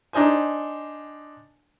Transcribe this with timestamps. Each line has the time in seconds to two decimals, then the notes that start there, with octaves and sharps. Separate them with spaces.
0.13 D4 D#4 C5 G#5